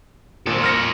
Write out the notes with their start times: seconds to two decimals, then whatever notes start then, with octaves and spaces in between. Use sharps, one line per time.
0.46 G#1 A#2 A4 C5
0.63 F6 A#6 C#7